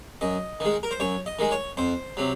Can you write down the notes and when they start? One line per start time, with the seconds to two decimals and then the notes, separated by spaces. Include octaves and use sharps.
0.21 F#2 D#5
0.60 D#3 G#3
0.83 A#4
0.91 C5
1.00 F#2 C#5
1.26 D#5
1.39 D#3 G#3
1.51 C#5
1.77 F2 C5
2.17 C3 F#3